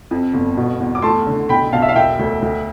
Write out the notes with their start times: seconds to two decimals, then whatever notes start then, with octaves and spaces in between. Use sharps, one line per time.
0.11 F2
0.34 G1
0.57 B2
0.80 E2
0.95 D6
1.02 A3 A5 C6
1.27 D3
1.49 B1 G5 B5
1.72 B1 F5 A5
1.82 E5
1.89 F5
1.96 E1 E5 G5
2.19 D2
2.42 D2